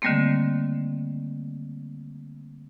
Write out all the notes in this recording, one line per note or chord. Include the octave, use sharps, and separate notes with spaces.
D3 D#3 G3 A3 A#3 C4